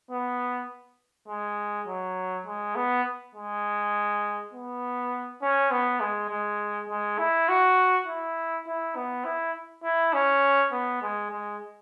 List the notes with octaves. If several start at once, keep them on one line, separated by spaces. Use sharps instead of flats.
B3
G#3
F#3
G#3
B3
G#3
B3
C#4
B3
G#3
G#3
G#3
E4
F#4
E4
E4
B3
E4
E4
C#4
B3
G#3
G#3